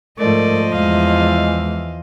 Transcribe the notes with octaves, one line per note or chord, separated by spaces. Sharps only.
G#2 F3 A3 A#4 D5 D#5
E2 E3 G#3 F5